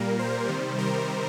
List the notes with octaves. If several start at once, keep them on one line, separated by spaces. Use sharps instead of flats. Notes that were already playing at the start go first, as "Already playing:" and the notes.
Already playing: A#2 G3 A#3 A#4
C5
C3 D#3 G3
A#4